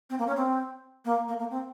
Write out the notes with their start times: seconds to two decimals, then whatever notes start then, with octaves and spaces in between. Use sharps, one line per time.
0.10 C4
0.19 A#3
0.27 C#4
0.36 C4
1.05 A#3
1.28 A#3
1.39 A#3
1.51 C4